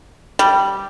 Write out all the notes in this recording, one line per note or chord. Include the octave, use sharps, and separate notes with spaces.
G3